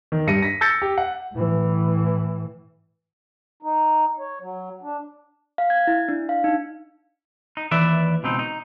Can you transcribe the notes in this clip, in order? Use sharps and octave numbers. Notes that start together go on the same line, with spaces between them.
D#3
G2 G3 A#6 C#7 D#7
A#6 B6
E6 G6 A6 A#6 C#7
G4
F#5
A2 E3
D#4
C#5
F#3
D4
F5
G#6
E4
D4
F5
D#4
D#4
D#2 E3 B4 D5 E5
C#2 B2 C4 D#4
D#4